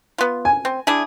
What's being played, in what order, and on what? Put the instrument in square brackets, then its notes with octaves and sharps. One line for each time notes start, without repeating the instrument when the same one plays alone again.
[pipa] B3 F4
[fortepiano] G#5
[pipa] C4
D4 E4 G#4